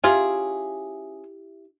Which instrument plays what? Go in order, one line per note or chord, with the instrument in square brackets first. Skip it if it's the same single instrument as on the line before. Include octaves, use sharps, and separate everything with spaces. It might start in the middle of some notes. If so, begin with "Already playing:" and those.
[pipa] C#4 F4 G#4 [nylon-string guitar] E4 G4 E5